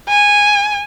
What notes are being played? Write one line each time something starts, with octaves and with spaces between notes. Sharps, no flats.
G#5